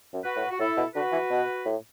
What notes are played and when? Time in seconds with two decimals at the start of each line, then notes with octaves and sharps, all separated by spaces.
0.13 F#2
0.24 F#4 B4
0.36 A2
0.50 F#4
0.59 A2 E4 A4
0.77 B2
0.95 D3 F#4 B4
1.12 E3
1.30 B2
1.65 A2